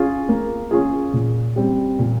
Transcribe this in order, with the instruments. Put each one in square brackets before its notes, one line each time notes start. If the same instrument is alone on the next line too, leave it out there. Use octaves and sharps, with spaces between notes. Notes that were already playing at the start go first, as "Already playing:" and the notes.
Already playing: [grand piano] C#4 F4 G#4
A#3
C#4 F4 G#4
A#2
G3 C4
A#2